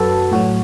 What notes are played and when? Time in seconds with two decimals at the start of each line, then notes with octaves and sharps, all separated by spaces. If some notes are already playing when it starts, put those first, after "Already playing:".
Already playing: F#2 F#3 F#4 A4 B4
0.32 A2 F#3 F#4